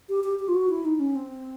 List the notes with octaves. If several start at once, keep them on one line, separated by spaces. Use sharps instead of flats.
G4
G4
G4
F4
F#4
E4
D#4
C#4
C4